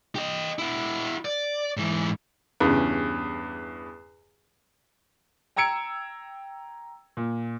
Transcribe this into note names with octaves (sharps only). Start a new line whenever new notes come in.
G4 D#5
E4 F#4
D5
G#2 E3
E2 G2 C#3
G5 A#5 E6 G#6 C#7 D7
A#2